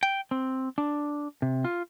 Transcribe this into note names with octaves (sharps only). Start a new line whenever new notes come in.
G5
C4
D4
C3
F4